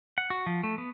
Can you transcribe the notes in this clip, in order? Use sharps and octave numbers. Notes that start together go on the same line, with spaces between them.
F#5
F#4
F3
A3
B3